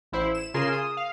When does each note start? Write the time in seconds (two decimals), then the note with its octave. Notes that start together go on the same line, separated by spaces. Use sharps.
0.12 A1 E4 C5
0.34 E7
0.54 C#3 F4 G#4 A#4 C6 E7
0.72 D#6
0.97 F5